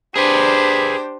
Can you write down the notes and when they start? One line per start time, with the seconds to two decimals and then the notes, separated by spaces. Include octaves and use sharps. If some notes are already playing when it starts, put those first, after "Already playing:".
0.16 D4 G4 G#4 B4 C5